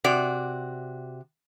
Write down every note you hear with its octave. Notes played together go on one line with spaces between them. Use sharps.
C3 F#4 D5